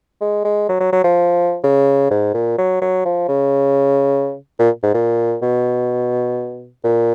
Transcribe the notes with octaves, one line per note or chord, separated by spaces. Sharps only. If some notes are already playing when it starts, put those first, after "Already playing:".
G#3
G#3
F#3
F#3
F#3
F3
C#3
G#2
A#2
F#3
F#3
F3
C#3
A#2
G#2
A#2
B2
A#2